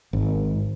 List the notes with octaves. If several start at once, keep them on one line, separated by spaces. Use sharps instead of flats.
G#1